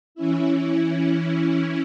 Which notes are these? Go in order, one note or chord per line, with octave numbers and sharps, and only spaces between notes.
E3 C#4 E4